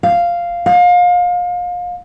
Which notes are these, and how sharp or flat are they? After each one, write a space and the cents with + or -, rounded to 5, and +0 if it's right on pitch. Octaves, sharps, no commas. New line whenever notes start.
F5 -5
F5 +30